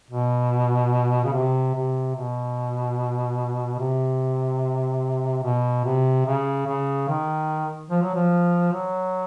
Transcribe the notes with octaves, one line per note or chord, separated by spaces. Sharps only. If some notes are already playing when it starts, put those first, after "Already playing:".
B2
C#3
C3
C3
B2
C3
B2
C3
C#3
C#3
D#3
F3
F#3
F3
F#3